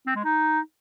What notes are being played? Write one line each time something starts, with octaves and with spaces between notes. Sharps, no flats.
C4
G#3
D#4